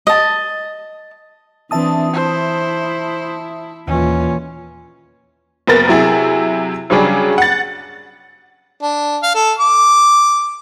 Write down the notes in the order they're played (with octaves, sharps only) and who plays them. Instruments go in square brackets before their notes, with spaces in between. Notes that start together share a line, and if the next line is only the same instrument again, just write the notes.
[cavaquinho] D#5 A5
[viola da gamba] E3 C4 D4 [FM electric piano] E5 A5 D#6
[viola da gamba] E4 [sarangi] C5
[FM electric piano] D#2 [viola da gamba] A#2 E3 F4 [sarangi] C#4
[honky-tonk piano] F#1 B3 A#4 A6
C3 F#3 E4 G#4
C#3 F#3 G3 C#4 D4 G#4
F#5 A6
[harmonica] D4
F5
A4
D6